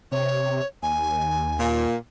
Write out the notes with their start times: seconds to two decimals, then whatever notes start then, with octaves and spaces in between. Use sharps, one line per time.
0.12 C3 C#5
0.83 D#2 G#5
1.59 A#2